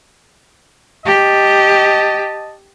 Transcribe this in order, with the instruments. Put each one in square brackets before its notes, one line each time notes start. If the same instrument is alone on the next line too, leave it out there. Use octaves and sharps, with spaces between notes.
[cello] G4 [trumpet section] D#5 A5